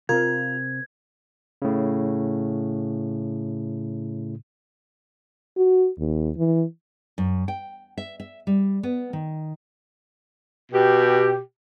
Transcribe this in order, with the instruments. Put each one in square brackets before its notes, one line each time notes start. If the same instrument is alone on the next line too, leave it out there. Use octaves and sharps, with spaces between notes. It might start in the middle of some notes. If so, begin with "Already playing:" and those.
[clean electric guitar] C3 C4 C5 [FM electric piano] F4 [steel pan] A#4 [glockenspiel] G#6
[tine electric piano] A2 C#3
[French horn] F#4
D#2
E3
[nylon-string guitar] F#2
G5
E5
E5
G3
B3
D#3
[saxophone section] B2 G4